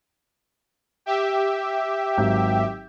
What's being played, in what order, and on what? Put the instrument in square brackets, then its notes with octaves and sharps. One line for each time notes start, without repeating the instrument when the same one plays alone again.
[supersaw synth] G4 E5
[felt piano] G#1 F#3 G6